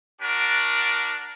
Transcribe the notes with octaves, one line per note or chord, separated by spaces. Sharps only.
D4 F#4 A#4